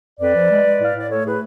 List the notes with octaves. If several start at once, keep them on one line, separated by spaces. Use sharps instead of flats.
F2 B4 D5
F3
G#3
G#3
A2 F5
A2 D5
A3 A4 C#5
A2 G#4 B4